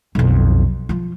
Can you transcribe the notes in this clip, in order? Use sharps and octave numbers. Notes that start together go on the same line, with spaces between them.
B1 F2
F3 F4